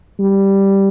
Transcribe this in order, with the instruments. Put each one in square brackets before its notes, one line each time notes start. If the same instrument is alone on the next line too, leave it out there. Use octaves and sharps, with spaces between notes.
[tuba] G3